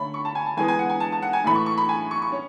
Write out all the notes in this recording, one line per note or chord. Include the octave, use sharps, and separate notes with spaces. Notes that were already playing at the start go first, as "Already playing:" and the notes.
Already playing: D3 A3 C#4 B5
C#6
A5
G#5
A5
E3 G#3 B3 G#5
G#5
F#5
G#5
A5
A5
F#5
G#5
A2 E3 A3 B5
C#6
C#6
B5
G#5
C#6
C#6
C#4